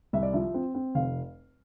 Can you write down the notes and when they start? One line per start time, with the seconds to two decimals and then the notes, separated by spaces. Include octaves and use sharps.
0.13 C2 E5
0.23 D5
0.33 F3 E5
0.54 C4
0.75 C4
0.95 F1 F5